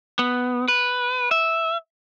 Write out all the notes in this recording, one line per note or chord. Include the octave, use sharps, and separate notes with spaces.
B3
B4
E5